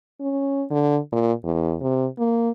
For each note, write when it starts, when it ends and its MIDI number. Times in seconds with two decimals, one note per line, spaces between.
0.20 0.64 61
0.71 0.98 50
1.12 1.32 46
1.44 1.75 40
1.81 2.06 48
2.18 2.50 58